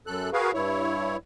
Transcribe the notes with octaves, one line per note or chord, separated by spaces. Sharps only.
F#2 A4 F#6
F#4 G#4 A#4 B4 F5
G2 E4 C#5